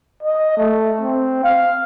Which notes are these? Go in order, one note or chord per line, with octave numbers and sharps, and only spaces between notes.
D#5
A3
C4
F5